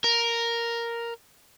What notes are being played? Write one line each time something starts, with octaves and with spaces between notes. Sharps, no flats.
A#4